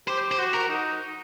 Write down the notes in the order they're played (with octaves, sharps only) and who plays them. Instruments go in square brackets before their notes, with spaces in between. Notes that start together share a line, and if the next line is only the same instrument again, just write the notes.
[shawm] G4 [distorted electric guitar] C5
[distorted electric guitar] C5
[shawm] F#4
[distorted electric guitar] A#4
[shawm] F#4
D#4